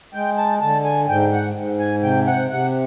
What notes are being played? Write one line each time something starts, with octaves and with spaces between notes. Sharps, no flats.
G#3 G5
A5
D3 A5
G#5
G#2 G5
F#5
G#2
G#5
C3 G5
F#5
C3 F#5